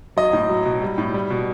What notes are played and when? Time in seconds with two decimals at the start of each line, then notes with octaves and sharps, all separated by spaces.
0.17 F#3 D#5
0.33 A2
0.49 F#3
0.66 B2
0.82 G3
0.98 A2
1.14 G3
1.30 B2